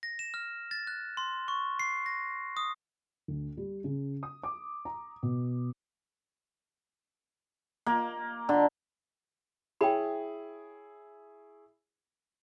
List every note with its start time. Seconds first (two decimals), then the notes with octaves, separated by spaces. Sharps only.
0.03 A#6
0.19 E7
0.34 F6
0.71 A6
0.87 F#6
1.17 C6
1.48 C#6
1.79 C7
2.06 A#6
2.57 D#6
3.28 D2
3.57 G3
3.84 C#3
4.23 D#6
4.44 D6
4.85 A#5
5.23 B2
7.87 A#3
8.49 D3
9.81 E4 G#4 C#5 G5 B5